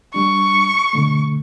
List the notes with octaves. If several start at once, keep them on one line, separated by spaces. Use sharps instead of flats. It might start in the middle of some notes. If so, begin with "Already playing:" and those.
G3 D4 C#6
B2 D3 A3